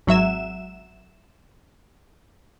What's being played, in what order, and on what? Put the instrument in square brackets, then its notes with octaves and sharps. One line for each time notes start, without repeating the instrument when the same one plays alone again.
[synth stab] G#1 F#3 E5 E7